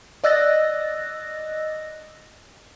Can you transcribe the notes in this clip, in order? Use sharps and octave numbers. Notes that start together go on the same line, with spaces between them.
D5 D#5 E6 F#6 A6 A#6